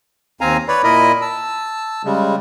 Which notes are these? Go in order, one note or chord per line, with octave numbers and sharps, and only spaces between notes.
D#2 C4 F5 G#5 A#5
B4 C#5 D5 B5
A#2 E4 A#4 D#5 B5
A5 E6
C#3 G3 G#3